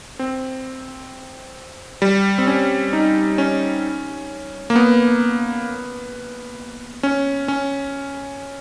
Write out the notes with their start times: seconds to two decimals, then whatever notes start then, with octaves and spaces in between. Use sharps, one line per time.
0.19 C4
2.02 G3
2.38 C4
2.47 C#4
2.93 D#4
3.38 C#4
4.70 A#3
4.76 B3
7.03 C#4
7.48 C#4